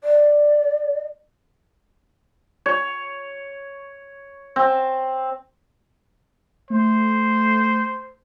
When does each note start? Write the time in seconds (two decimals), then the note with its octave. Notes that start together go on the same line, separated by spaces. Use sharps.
0.04 D5
2.66 C#5
4.56 C4
6.70 A3 C5